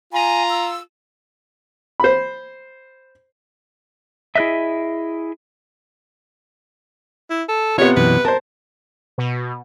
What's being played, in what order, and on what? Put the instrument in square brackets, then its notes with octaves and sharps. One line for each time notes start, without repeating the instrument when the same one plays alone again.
[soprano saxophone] F4 [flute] G#5 [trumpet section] A#5
[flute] E6
[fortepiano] C5 B5
[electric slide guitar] E4 G#4 B4 D#5 E5
[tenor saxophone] E4
A4
[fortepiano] C3 B3 [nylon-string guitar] F4 [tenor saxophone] C#5
[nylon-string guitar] F#2 B2 E3 [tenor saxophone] B4
[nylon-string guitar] A#4 [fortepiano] C5 A5
[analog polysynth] B2